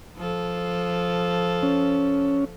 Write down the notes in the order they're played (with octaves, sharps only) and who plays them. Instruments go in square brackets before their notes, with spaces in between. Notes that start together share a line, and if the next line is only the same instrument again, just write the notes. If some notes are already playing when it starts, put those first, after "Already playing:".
[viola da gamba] F3 A4
[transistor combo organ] C#4